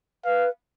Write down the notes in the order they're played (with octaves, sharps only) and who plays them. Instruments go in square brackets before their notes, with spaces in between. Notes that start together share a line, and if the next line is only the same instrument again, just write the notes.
[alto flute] B4 [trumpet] F5